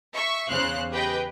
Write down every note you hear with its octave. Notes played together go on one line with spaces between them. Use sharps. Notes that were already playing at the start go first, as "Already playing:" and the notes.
E5 C#6
E2 C#3 C5 F5 F#6
G4 G#4 B4 D#5 G5